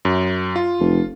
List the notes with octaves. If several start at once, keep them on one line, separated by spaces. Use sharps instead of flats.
F#2
F4
F1